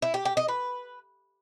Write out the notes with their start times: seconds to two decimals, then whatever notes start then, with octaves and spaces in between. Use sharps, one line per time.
0.02 E4
0.14 G4
0.25 G4
0.37 D#5
0.48 B4